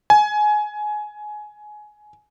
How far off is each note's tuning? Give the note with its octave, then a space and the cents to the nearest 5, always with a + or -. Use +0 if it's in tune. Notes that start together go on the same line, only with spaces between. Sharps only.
G#5 +20